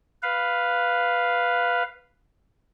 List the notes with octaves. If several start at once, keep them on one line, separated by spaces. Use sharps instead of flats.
B4 F5